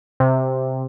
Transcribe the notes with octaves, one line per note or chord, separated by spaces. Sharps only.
C3